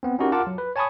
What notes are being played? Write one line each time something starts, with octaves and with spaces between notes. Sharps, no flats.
B3 C4
C#4 D#4 E4 F#4 G4 A#4
F4 A#4 F#5 A5 D6
F#3
B4
C#5 G#5 A5 B5 C#6 D#6